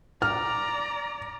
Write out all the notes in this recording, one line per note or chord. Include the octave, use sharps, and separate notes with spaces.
D5 A#5 F6